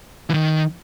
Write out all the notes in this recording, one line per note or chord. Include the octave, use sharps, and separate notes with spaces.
E3
D#3